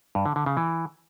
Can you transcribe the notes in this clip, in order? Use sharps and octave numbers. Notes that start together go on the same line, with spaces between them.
G2
D3
D3
C#3
E3